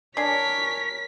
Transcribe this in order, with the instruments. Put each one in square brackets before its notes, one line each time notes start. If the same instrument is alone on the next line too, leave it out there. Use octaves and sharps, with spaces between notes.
[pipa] D4 G#5 [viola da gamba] A#4 C#5 [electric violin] B6